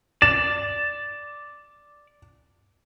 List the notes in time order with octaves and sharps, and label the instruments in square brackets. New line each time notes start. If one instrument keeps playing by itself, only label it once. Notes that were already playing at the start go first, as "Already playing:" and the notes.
[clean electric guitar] D5 [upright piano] E7